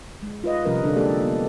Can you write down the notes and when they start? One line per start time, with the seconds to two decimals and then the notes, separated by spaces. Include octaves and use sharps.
0.23 G#3
0.44 F4 B4 D#5
0.65 C3 F3 G3 C#4 A#4 B4
0.82 D3 D4 A4
0.94 G#3 A#3 G4 A4 D5
1.19 A#3 B3